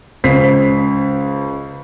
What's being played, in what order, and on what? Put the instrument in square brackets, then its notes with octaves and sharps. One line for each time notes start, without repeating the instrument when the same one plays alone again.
[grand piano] C#2 C5 B6 C7